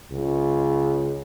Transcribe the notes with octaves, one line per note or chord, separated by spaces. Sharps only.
C#2